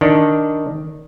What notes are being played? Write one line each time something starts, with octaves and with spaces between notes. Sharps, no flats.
D#3 D4